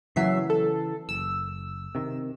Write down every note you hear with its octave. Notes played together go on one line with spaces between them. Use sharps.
C#3 E3 F#3 A#3 E5 C7
A4
F#1 E6
C3 D#3